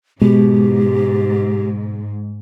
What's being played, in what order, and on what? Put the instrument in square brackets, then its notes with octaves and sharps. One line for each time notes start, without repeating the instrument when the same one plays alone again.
[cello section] G#2 [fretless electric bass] B2 [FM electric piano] G#3 [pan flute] G4